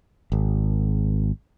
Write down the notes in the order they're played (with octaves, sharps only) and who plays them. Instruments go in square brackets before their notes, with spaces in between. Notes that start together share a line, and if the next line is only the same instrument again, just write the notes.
[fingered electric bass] G#1